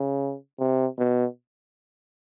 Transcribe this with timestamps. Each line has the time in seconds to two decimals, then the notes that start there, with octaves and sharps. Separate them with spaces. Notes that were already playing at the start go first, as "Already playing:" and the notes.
Already playing: C#3
0.59 C3
0.98 B2